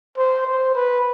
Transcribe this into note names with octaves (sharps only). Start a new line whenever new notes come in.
C5
C5
B4